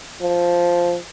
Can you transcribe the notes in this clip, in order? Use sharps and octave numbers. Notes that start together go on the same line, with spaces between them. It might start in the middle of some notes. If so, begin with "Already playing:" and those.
F3